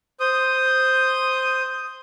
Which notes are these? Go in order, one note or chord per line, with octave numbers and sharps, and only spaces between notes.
C5 D#6